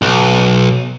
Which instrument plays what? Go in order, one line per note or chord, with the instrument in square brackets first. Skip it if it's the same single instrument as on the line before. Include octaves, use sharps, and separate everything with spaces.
[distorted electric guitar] B1